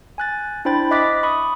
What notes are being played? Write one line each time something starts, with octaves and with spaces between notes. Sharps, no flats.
G#5 F#6 A6
D4 E4 C5 G5 B5 A6
D#5 E5 D6 F#6 A6 B6
B5 C#6 D#6